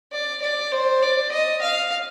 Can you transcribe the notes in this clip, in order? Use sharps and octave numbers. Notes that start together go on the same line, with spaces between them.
D5
D5
C5
D5
D#5
F5